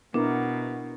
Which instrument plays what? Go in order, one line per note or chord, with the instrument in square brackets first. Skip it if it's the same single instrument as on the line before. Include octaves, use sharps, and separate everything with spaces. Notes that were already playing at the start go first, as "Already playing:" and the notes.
[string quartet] B2 [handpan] B3 E4 A#4 [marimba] D4